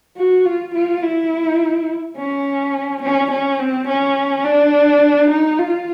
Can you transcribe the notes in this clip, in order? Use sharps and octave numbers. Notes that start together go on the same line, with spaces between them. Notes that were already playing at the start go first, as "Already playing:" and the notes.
F#4
F4
F4
E4
C#4
C#4
C#4
C4
C#4
D4
D#4
F4